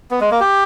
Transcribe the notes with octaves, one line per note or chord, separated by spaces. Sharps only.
B3
G#3
A#3
G4